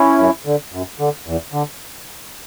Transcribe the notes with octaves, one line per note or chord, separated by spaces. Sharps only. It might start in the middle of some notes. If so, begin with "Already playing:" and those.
Already playing: C#4 E4
F#2
D3
F#2
D3
E2
D3